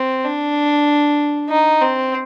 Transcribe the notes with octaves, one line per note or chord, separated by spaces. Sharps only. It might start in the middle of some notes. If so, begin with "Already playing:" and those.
Already playing: C4
D4
D#4
C4